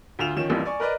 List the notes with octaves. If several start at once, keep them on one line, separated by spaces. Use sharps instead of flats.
D2 F4 E7 F7
D#3 F3 C#4 E7
A1 F2 E3 G3 A#3
D5 G#5 C#6
A#4 B4 D5 D#5